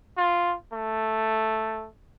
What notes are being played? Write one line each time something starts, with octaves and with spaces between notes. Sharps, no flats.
F4
A3